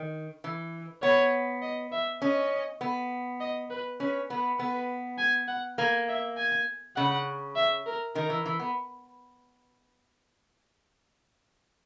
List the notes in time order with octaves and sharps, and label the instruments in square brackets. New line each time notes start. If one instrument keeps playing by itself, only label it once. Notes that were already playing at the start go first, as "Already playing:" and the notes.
Already playing: [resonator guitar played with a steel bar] D#3
E3
[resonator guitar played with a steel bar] B3 [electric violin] C#5
[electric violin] D#5
E5
[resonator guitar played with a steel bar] C#4 [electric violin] D#5
[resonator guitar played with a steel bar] B3
[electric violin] D#5
B4
[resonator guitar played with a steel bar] C#4 [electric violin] B4
[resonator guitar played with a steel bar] B3 [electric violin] B4
[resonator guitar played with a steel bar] B3 [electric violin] B4
[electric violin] G#5
F#5
[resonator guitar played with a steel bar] A#3 [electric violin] G#5
[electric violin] E5
G#5
[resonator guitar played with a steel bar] C#3 [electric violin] F#5
[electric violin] E5
A#4
[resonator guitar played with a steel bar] D#3 [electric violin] A#4
[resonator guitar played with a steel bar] E3
E3
B3